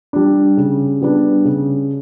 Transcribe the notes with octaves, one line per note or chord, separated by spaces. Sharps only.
G3 D4
C#3
G3 B3 D4
C#3